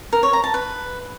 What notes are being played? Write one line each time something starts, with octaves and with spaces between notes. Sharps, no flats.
A#4
C#5
A#5
A5
B4